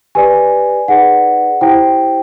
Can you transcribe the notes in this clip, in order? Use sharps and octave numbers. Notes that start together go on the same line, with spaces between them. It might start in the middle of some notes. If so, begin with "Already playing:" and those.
G4 B4 D5 G#5
D#4 G#4 B4 D5 F#5
E4 G4 C5 G5